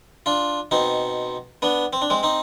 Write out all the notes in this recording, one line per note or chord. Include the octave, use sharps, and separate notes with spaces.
D4 F4
B2 C4 D#4
B3 D4
C4
D4
G#3 C4
C4 D#4